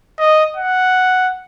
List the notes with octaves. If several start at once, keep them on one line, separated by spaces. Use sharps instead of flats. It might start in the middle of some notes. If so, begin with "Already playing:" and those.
D#5
F#5